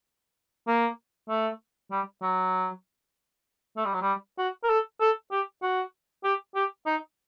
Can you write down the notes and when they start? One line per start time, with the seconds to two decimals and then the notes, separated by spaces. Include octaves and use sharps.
0.68 A#3
1.29 A3
1.91 G3
2.22 F#3
3.77 A3
3.85 G3
3.94 F#3
4.02 G3
4.38 F#4
4.64 A#4
4.69 A4
5.01 A4
5.31 G4
5.62 F#4
6.24 G4
6.55 G4
6.86 D#4